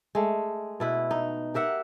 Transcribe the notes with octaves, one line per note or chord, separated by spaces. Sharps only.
G#3 A3
B2 E4 B4
D#4
G4 A#4 E5 F#5